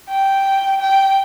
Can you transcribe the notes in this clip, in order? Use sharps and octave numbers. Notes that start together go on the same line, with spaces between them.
G5
G5